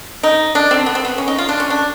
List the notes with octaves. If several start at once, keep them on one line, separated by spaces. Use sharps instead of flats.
D#4
D4
C4
B3
C4
B3
C#4
D#4
F4
D4
C#4
D4